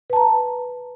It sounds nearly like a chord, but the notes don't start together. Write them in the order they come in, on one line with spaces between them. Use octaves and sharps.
B4 A5 A#5